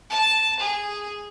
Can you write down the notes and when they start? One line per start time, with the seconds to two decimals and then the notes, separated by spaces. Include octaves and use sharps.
0.10 A5
0.59 G#4